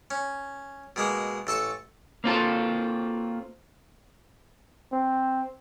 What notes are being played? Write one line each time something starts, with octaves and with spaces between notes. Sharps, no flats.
C#4
B2 G#3 A#3
A1 A4 A5 C#6
A#3 C4 F4 A4
C4